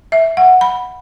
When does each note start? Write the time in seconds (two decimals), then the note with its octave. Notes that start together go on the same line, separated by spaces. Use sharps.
0.12 E5
0.37 F#5
0.61 B5